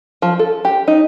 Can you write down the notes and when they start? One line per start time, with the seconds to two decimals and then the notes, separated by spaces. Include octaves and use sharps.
0.22 F3
0.39 A4
0.65 G4
0.88 D#4